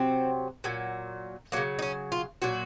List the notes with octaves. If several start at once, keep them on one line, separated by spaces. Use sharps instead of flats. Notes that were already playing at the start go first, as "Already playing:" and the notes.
Already playing: C3 F#3 C4
A#2 F#3
C#3 F#3 A#3
D#4
C#4
F4
A#2 F#3 F#4